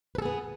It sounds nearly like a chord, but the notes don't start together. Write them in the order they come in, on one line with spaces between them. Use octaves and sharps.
B4 A4 G#4 B3